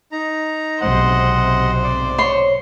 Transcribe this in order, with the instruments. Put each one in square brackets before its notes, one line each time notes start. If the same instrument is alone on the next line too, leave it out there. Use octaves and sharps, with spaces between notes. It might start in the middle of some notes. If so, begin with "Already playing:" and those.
[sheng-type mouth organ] D#4 A#5
[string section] B1 G#2 C3 [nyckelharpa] C5 [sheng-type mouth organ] D#5 F#5
[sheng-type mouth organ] D5
[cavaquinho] C#5 C6